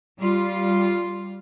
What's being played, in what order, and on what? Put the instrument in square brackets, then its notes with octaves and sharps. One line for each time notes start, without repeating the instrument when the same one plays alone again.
[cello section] G3 F4